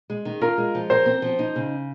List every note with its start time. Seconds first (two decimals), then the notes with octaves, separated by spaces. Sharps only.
0.10 G#3
0.25 D#3
0.41 F4 A#4
0.58 G#3
0.75 F3
0.90 A#4 C5
1.06 C4
1.22 F3
1.39 D#4
1.56 C#3